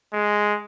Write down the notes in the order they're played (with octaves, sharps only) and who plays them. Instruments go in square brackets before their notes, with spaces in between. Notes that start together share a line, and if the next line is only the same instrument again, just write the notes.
[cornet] G#3